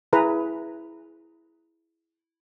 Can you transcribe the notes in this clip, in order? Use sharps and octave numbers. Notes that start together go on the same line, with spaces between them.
E4 G#4 B4 A#5